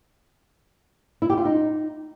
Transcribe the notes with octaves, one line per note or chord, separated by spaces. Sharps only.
E4
G4
F4
D#4